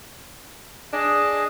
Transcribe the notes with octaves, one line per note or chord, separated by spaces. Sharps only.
D4 G#4 D#5